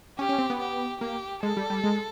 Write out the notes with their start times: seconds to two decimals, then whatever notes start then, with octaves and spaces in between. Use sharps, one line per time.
0.19 C#4 G4
0.29 C#4
0.39 C4
0.50 B3
0.60 G4
1.01 A#3 G4
1.43 G#3 A4
1.57 G3
1.70 G3
1.84 G#3